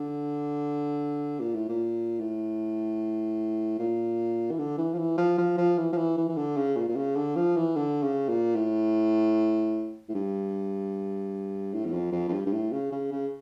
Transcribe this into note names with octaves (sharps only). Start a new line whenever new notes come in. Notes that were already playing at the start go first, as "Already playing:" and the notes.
Already playing: D3
A#2
A2
A#2
A2
A#2
E3
D3
E3
F3
E3
F3
F3
F3
E3
F3
E3
E3
E3
D3
C#3
A#2
A#2
C#3
D3
F3
E3
D3
C#3
A#2
A2
A2
G2
A2
E2
F2
F2
F2
G2
G2
A2
C#3
C#3
C#3